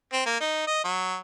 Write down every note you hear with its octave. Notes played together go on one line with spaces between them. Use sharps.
C4
A#3
D#4
D#5
F#3